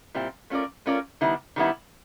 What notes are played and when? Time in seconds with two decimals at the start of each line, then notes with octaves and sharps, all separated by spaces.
0.15 A#2 G3 C4 E4
0.50 A3 C#4 F4 A#4 D5
0.86 A3 C#4 F4 A#4 D5
1.21 D#3 G3 B3 E4
1.56 D#3 G3 B3 E4